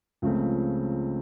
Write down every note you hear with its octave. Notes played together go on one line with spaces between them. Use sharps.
C#2 C#3 F3 A3 C4